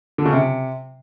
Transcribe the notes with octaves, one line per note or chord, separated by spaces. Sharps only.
D3
C#3
C3